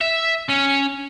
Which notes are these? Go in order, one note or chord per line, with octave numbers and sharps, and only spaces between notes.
E5
C#4